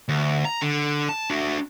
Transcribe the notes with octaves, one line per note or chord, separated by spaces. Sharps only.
D2
A#5
D3
A5
D4 F#4